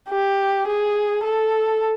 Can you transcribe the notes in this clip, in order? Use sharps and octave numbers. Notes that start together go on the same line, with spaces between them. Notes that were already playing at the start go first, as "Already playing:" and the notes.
G4
G#4
A4